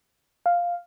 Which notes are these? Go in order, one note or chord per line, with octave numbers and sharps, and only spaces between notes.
F5